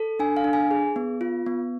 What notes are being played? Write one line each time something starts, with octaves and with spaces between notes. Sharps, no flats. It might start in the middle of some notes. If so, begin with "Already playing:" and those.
Already playing: A4
D4 G#5
F5
D4
G#5
G#4
B3
F4
B3